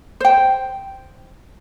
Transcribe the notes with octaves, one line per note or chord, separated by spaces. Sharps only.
C5 G5